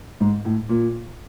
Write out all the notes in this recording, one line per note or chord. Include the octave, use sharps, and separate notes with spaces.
G#2
A2
A#2